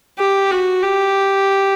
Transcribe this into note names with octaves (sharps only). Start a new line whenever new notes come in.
G4
F#4
G4